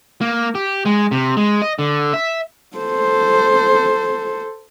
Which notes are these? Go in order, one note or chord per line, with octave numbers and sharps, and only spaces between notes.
A#3
G4
G#3
C3
G#3
D#5
D3
E5
A4 C5